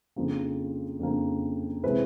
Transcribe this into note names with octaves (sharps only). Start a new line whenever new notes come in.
F2 C#3 F3 A#3 D4
F2 C#3 F3 A#3 D4
C3 E3 G#3 C4 E4 B4